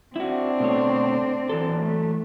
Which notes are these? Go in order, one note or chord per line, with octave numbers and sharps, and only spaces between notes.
C4 D4 E4 F#4
B2 A3 C#5
E3 F#3 A4
A3